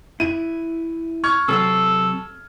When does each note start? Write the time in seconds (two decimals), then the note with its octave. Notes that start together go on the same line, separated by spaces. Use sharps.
0.20 E4 D#7
1.24 C#6 F6 G#6
1.48 C3 F#3 C4 A4